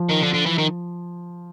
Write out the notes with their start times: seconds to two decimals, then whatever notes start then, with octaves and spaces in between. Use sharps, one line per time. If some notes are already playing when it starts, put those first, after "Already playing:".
Already playing: F3
0.09 D#3
0.22 D3
0.34 D3
0.46 E3
0.58 D#3